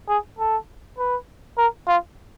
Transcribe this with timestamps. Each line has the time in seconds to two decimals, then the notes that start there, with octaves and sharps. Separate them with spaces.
0.09 G#4
0.39 A4
0.98 B4
1.58 A#4
1.88 F4